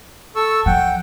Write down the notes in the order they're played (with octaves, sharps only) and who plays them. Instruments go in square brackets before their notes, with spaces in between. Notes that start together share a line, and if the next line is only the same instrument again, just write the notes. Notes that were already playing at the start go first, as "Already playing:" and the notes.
[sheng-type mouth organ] A4 C#6 E6
[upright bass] F3 [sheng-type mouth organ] F#5 G5